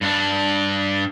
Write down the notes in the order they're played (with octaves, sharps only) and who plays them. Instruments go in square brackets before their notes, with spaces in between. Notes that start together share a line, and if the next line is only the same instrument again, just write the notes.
[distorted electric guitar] G2 D4